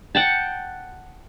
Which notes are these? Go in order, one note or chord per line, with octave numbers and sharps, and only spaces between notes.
F#5 G5 A5